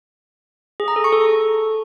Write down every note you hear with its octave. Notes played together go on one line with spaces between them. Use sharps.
G#4
A#5
A4
C#6
A4